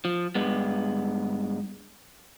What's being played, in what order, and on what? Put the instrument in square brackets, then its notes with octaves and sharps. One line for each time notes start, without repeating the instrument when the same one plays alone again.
[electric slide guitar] F3
G2 G#3 B3